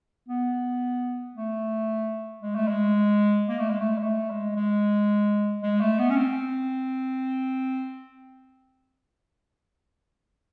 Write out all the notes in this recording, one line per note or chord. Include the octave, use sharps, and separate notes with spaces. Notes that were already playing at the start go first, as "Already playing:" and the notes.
B3
A3
G#3
A3
G#3
A#3
A3
G#3
A3
G#3
A3
G#3
G#3
G#3
A3
B3
C#4
C4